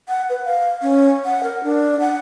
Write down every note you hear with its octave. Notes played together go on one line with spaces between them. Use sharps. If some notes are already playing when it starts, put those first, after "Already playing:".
F#5
B4
F5
C#4
F#5
A#4
D4
F#5